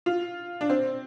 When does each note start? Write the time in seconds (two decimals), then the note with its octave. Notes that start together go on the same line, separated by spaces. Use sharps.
0.06 F4
0.61 D4
0.70 C4